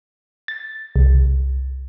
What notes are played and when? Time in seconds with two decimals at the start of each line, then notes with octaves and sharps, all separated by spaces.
0.48 A6
0.96 C2